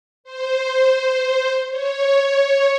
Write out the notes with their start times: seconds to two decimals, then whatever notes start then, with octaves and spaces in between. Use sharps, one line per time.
0.24 C5
1.70 C#5